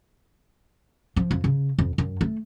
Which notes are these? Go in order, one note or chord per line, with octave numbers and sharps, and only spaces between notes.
F3
F2
C#3
F2
F#2
A3